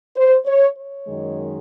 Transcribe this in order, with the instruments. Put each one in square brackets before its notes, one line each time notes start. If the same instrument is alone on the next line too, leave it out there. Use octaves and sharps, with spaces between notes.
[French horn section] C5
C#5
C#5
F#2 D#3 G#3